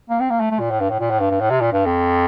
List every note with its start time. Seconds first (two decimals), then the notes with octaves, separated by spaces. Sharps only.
0.10 A#3
0.20 C4
0.30 A#3
0.41 A3
0.51 A3
0.60 A#2
0.71 A2
0.80 G2
0.90 A2
1.00 A#2
1.11 A2
1.20 G2
1.31 G2
1.41 A2
1.51 C3
1.61 A#2
1.73 G2
1.86 F2